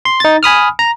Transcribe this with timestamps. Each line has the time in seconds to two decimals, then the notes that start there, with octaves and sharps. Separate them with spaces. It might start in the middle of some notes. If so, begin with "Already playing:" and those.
0.05 C6
0.20 D#4 A6
0.43 G#5 B5 D#6 F6
0.79 A#5